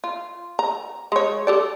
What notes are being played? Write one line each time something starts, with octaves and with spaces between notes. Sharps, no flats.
F4
A#5
G#3 C#5
G4 A4 D5